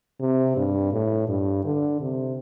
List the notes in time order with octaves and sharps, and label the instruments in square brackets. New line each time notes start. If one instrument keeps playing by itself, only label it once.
[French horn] C3
G2
A2
G2
D3
C3